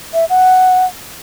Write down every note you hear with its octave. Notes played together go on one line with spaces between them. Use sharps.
E5
F#5